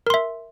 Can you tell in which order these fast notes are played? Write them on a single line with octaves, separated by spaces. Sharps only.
A#4 C6 E5